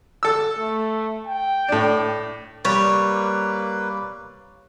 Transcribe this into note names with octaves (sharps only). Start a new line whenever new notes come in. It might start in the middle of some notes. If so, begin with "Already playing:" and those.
A4 E6
A3
G5
A2 D4
G3 A#3 B4 C#5